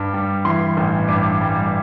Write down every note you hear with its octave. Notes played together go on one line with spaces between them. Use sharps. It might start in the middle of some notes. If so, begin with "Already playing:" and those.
Already playing: G2
G3
E3 C6
A1
G2 D6
G3